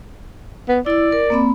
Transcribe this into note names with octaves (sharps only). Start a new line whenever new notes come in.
B3
E4 D5 E6
A#4
A#3 C4 B5